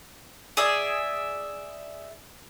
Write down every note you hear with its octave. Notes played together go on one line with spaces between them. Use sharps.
G#4 D5 E5